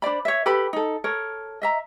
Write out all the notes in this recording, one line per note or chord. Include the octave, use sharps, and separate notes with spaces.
D4 C5 D5 B5
C#5 E5
G4 A4 B4 B5
D#4 A4
A4 A#4 C#5
D#5 E5 A#5